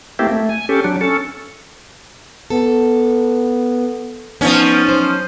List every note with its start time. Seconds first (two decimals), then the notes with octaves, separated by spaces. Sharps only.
0.19 A3 A#3 C4 E4 G4
0.32 A3
0.49 G#5
0.69 C#4 G4 A4
0.84 F#3 D4
1.01 C#4 A4
2.50 B3 A4
4.41 F3 B3 C#4 D#4
4.87 F#3 C5